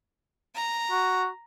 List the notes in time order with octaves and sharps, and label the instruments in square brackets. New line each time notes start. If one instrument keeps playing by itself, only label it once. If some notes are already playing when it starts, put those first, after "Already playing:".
[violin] A#5
[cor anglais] F#4